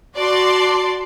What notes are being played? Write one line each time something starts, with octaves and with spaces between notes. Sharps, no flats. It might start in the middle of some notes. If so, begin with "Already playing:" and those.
F#4 D5 A5 C6